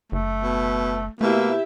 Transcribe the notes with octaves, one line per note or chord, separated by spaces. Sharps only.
F#1 A3
B2
B2 A3 A#3 E4 G4 E5